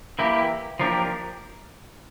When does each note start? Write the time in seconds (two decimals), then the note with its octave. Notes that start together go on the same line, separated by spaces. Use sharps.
0.19 E3 A#3 E4 G4
0.79 F3 A#3 D4 G4 A#4